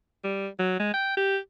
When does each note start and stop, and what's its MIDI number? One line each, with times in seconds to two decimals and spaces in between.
0.24 0.48 55
0.59 0.75 54
0.79 0.91 56
0.94 1.12 79
1.17 1.37 67